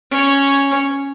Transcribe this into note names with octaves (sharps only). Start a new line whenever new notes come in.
C#4 C#5